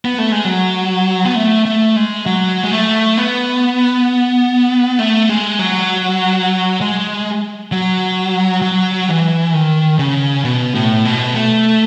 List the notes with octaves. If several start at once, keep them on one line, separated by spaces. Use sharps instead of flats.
B3
A3
G#3
F#3
B3
A3
A3
G#3
F#3
G#3
A3
B3
A3
G#3
F#3
G#3
F#3
F#3
E3
D#3
C#3
B2
A2
B2
A3